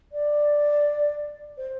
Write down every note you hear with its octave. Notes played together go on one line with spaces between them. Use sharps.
D5
C5